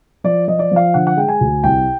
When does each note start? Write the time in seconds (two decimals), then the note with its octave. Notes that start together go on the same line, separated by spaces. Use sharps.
0.24 F3 D5
0.48 F3 D#5
0.59 D5
0.71 F3 F5
0.94 D3 F#5
1.07 F#5
1.17 G#3 G5
1.28 G#5
1.41 D2
1.64 C2 G5